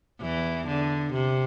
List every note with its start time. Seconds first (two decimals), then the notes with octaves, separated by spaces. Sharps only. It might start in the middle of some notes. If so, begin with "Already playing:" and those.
0.21 E2 E3
0.68 D3
1.13 C3